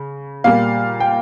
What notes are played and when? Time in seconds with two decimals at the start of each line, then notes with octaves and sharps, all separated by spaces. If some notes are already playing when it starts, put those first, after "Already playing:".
Already playing: C#3
0.44 A#2 G3 A#3 F5
1.00 G5